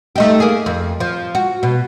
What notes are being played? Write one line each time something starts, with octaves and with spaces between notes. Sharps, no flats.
A3 D#4 G4
A#3 G#4
F2
F3
F#4
B2